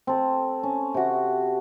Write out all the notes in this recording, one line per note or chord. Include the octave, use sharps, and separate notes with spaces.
C4 A4
C#4
C3 F#4